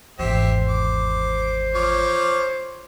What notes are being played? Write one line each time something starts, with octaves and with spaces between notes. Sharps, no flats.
G#1 E2 G4 C5 E5
D6
F3 C#5 D6